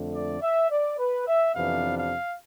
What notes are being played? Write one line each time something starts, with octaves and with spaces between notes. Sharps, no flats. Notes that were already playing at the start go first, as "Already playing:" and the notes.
Already playing: F2 D3 A3
D5
E5
D5
B4
E5
F2 C3 E3 B3 D4 F5
F5